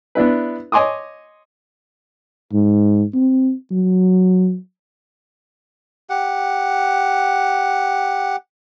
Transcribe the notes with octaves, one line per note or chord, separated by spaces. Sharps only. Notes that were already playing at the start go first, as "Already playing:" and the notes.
B3 D4 E4 B4
C#5 D#5 G#5 C6 D6 D#6
G#2
C4
F#3
G4 F#5